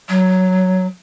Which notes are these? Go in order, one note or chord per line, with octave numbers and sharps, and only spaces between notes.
F#3